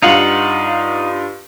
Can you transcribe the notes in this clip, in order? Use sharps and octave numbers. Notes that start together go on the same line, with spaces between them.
G2 D#4 F4 F5 F#5 C#7